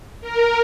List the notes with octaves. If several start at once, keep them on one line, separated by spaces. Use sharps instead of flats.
A#4